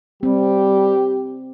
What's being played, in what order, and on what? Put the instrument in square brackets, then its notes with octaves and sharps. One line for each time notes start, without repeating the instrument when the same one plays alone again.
[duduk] G3 [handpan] C4 [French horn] G4